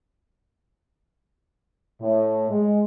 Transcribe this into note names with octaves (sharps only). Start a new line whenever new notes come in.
A2
G#3